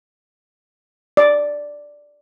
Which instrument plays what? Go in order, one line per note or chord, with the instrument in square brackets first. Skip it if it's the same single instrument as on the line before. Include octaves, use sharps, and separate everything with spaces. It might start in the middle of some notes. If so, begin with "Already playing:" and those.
[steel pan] D5